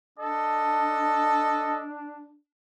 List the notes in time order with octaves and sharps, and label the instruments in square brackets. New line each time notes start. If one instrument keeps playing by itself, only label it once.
[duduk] D4 [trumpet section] A4 D#5